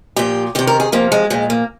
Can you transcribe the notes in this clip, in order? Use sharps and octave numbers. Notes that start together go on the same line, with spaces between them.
A#2 F3 G4
C3 D#3 G4
A#4
G#4
C3 F3 A#3
G#3
A#2 F3 G#3
A#3